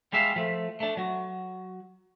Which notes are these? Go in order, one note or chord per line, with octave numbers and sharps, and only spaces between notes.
G3 G#3 G4 E5 F5
F3 A3
A3 D4
F#3 F#4